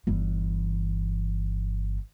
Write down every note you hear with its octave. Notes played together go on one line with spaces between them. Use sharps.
G1 E3